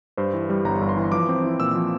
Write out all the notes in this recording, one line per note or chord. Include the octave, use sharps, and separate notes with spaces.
G2 C5
E3
G3
G1 A#5
G2
C6
E3
F3 D6
C4
E4
A#2 E6
F3